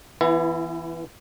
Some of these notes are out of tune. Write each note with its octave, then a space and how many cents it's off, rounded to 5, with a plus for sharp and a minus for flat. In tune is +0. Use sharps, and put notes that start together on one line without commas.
E3 +0 B3 +0 E4 +35